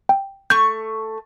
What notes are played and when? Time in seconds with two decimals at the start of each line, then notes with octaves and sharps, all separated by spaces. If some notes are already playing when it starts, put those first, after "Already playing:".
0.09 G5
0.50 A3 C#6 G6